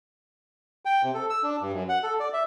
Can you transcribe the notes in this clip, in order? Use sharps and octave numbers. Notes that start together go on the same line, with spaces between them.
G5
C3
A4
E6
D4
G2
F#2
F#5
A4
D5
E5